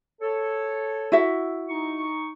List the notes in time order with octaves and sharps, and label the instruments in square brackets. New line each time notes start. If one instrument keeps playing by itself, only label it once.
[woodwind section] A4 C#5
[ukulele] E4 F#4 E5
[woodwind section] D#4 C#6